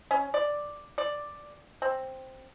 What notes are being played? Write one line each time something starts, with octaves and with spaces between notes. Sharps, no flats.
C#4
D5
D5
C4